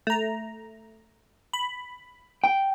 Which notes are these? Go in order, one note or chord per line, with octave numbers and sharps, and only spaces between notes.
A3 A#5
B5
G5